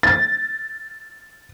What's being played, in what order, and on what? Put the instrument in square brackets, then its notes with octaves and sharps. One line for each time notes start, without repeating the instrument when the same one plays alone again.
[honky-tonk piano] A6